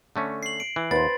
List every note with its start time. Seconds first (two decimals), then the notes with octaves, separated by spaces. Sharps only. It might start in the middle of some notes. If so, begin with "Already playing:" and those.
0.16 D3 A3 C#4
0.43 C7 F#7
0.60 D7
0.76 E3
0.91 D#2 B4 C5 A6